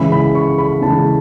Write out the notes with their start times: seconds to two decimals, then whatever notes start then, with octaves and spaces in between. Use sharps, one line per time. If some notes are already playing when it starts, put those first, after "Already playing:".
Already playing: C#3 E3 G#3 B5
0.12 B5
0.35 C#6
0.58 B5
0.82 C#3 E3 G#3 A5